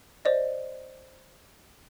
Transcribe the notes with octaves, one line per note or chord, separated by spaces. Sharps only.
C5 D5 D#5